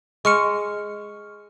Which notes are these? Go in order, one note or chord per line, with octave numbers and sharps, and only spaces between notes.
G#3 C#6 F6 C#7